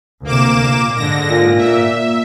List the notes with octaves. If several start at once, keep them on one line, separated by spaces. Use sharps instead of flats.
D2 C3 A#3 D6 E7
A#2
G#2 D3 A#6
A#2
A#3 E5